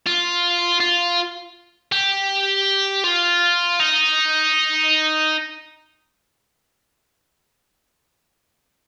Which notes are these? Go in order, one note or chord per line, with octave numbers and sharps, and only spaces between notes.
F4
F4
G4
F4
D#4